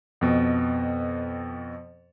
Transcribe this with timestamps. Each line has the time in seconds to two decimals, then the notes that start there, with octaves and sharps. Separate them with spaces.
0.21 F2 B2